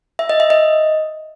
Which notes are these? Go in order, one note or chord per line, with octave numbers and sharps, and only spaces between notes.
E5
D#5
E5
D#5